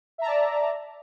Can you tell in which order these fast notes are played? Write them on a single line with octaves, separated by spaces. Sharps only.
E5 A#5 A5 D5